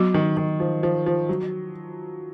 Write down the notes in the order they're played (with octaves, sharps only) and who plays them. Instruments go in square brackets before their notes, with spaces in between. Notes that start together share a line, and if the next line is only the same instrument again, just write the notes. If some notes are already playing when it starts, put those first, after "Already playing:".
Already playing: [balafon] F#3 B3 F#4
[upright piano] D#3
D#3
F3
F3
F3
F#3